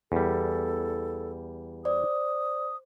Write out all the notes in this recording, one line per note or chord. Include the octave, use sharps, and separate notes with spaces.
E2 G3 A4
C5 D5 D#6